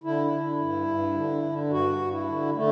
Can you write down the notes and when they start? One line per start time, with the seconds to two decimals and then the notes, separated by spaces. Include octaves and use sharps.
0.03 D3 E4
0.32 D3
0.60 G2
0.88 G2
1.15 D3
1.43 D3
1.70 G2 F#4
1.98 G2
2.12 E4
2.27 D3
2.55 D3 A3